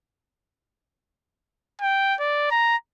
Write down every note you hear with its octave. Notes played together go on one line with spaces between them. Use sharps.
G5
D5
A#5